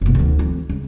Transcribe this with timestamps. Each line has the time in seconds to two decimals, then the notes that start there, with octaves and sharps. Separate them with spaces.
0.01 F#1 B2
0.15 D2 D#3
0.39 F2
0.69 C#2